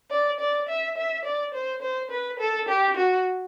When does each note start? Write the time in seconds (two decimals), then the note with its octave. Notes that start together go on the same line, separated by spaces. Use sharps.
0.10 D5
0.40 D5
0.69 E5
0.97 E5
1.25 D5
1.54 C5
1.82 C5
2.11 B4
2.39 A4
2.69 G4
2.96 F#4